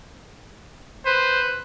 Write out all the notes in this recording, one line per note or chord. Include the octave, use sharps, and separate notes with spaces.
B4 C5